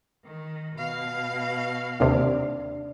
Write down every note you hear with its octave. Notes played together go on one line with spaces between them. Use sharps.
D#3
B2 F5
D#2 C3 D4